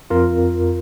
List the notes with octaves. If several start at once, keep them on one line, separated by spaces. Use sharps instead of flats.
F2 F4 A#4